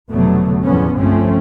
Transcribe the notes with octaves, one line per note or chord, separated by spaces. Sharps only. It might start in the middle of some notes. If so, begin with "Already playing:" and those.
F1 B2 D3 F#3 A3 B3
E2 A2 D3 F3 B3 C#4
G1 C2 F3 A3 C4 C#4